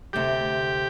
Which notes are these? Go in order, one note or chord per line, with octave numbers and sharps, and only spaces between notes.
D2 C3 A3 G4